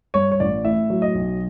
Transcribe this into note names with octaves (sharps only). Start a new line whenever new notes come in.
G2 C#5
C#5
A1 D5
A2 E5
F#3
D#5
B1